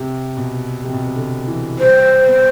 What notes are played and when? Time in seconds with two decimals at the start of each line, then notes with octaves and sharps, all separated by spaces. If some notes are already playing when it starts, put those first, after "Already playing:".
Already playing: C3
0.37 B2
0.84 C3
0.93 B2
1.02 C3
1.16 D3
1.47 E3
1.79 G3 C5
2.26 B3